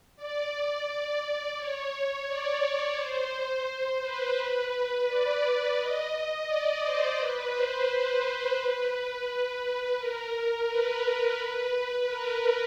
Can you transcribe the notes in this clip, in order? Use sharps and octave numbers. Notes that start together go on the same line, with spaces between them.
D5
C#5
D5
C#5
C5
C5
B4
B4
D5
D#5
D5
C5
B4
C5
B4
B4
A#4
B4
B4
B4
A#4